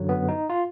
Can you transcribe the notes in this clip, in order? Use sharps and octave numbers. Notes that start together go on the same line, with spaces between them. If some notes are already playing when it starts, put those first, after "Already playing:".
Already playing: F#2 D3 F#3
B3
D#4
F4